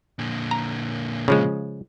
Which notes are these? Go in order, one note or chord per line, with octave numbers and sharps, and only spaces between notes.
A#2 D3
A#5
C#3 F3 G#3